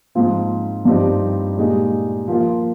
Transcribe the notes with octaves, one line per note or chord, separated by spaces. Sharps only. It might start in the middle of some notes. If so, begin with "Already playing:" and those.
G#2 F3 C4 F4
G2 F3 C4 D#4 G4
A#2 G#3 D#4 G4
F3 A#3 F4